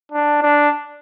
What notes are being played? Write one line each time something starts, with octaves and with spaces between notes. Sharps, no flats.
D4
D4